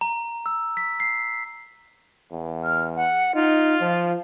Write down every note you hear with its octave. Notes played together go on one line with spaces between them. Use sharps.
A#5
E6
B6
C7
E2
F6
F#5
D#4 F4
F3